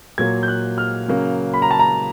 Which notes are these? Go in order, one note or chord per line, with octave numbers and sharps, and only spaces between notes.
A#2 F#3 A#3 G#6
G6
F#6
F6
C#3 F#3 A#3
B5
A#5
A5
A#5